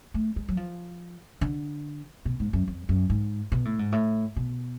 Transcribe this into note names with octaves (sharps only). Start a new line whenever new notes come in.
A3
G#3
F#3
F3
D3
B2
G#2
F#2
F2
F#2
G#2
B2
A2
G#2
A2
B2